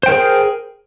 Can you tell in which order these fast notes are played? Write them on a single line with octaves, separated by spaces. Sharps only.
C5 G5 A#4 G#4